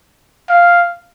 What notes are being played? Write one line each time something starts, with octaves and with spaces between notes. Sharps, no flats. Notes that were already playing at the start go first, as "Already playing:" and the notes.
F5